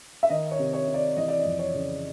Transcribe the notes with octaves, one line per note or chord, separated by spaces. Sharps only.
E5
D#3 D#5
C#5
C3
C#5
C3
D5
E3 D#5
D5
D#5
F2
C#5
C#3